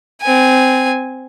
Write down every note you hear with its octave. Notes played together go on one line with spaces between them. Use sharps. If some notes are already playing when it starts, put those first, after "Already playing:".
C4 G#5